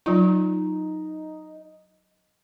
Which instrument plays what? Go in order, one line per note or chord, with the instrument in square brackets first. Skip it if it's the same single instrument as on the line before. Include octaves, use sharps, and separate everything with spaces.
[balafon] F#3 F4 [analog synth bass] D#4